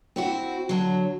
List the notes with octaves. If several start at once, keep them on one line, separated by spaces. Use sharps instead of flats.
C4 E4 F#4
D3 F#3